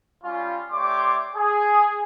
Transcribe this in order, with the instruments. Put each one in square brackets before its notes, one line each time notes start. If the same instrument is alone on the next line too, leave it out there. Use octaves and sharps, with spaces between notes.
[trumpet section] G3 C#4 F4
A3 G4 C#5 D5 C6 D6
G#4